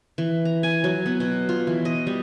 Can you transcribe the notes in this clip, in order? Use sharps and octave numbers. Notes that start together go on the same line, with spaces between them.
E3
A#5
G#5
F#3
B3
B2
F4
E3
D#5
G3